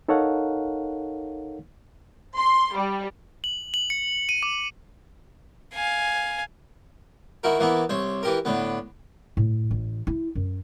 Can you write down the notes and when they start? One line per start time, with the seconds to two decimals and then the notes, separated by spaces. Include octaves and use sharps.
0.08 D#4 A4 A#4 C#5 F5 F#5
2.37 C6
2.77 G3
3.44 F#7
3.74 F#7
3.90 C#7
4.29 D#7
4.43 D6
5.74 F5 G#5
7.43 D#3 E4 F#4 A#4
7.59 E3 A#3 B3 E4
7.89 C2 C5 C#5
8.23 E3 G4 A#4
8.45 A2 D3 B3
9.37 A2
9.71 A1
10.07 E4
10.35 F#2